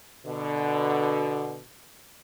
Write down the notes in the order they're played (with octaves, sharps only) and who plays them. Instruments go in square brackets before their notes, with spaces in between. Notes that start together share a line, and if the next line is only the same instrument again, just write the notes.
[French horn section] B2 D3